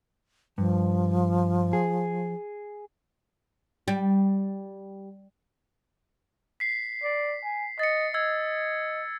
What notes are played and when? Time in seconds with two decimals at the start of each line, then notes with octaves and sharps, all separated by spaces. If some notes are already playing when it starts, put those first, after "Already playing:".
0.58 G2 F3
1.73 G#4
3.88 G3
6.60 B6 C7
7.04 D5
7.44 G#5
7.79 D#5 A6 C#7
8.14 D#5 E6 G#6